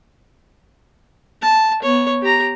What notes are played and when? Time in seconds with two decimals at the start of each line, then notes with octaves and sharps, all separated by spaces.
1.42 A5
1.82 B3 C#5
2.22 G4 A#5